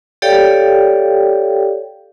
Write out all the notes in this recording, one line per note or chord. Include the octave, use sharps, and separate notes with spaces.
G4 A4 C#5 D5 F5 G5